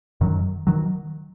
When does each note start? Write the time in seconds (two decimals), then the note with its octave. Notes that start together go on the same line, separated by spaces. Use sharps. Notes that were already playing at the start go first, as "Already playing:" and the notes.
0.21 F#2 D#3 F#3
0.67 D#3 F#3